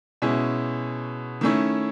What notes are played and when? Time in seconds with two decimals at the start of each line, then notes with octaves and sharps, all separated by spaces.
0.22 B2 G#3 C#4 E4
1.41 D#3 A3 C#4 E4